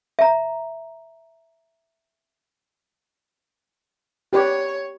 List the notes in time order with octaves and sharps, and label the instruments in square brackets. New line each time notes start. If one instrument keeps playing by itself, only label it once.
[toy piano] E5 A#5
[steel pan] G4 B4 D5 [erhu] C#5